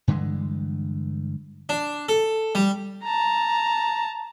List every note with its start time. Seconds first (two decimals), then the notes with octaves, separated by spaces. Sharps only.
0.08 G2 D3 E3 G#3
1.69 D4
2.09 A4
2.55 G3
3.04 A5 A#5